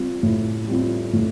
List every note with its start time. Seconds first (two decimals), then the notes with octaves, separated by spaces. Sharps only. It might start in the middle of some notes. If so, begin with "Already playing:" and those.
Already playing: G3 C4 F4
0.23 A2
0.67 G3 C4 F4
1.13 A2